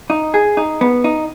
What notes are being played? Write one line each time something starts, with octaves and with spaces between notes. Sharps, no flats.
D#4
G#4
D#4
B3
D#4